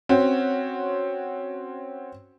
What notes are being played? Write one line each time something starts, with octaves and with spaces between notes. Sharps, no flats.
C4 C#4 F#4